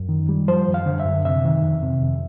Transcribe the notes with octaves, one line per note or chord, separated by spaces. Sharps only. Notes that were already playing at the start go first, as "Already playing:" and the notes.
Already playing: F#2
D#3
G3
F3 C5
F#2
F5
D3
E5
F#2
C3 E5
D#3
F2
C3
F2